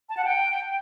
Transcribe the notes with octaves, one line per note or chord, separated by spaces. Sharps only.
A5
F#5
G5